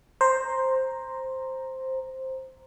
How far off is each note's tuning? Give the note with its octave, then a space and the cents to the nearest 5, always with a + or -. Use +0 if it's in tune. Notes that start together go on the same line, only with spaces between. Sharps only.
C5 +5 A#5 +0